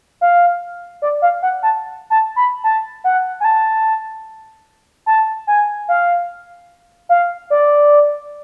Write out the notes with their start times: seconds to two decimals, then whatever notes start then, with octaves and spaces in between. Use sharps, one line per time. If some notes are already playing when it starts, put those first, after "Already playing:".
0.21 F5
1.02 D5
1.22 F5
1.42 F#5
1.63 A5
2.10 A5
2.36 B5
2.64 A5
3.04 F#5
3.40 G#5
3.45 A5
5.06 A5
5.47 G#5
5.88 F5
7.09 F5
7.50 D5